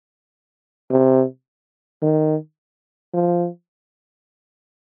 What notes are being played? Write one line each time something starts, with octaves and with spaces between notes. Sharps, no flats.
C3
D#3
F3